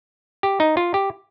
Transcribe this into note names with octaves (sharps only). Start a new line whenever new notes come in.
G4
D#4
F4
G4